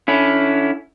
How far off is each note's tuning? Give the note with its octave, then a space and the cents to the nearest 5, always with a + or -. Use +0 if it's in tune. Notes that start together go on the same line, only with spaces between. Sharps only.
D3 +0 C#4 +15 E4 +0